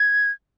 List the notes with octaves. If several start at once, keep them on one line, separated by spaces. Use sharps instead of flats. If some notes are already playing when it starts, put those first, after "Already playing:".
Already playing: G#6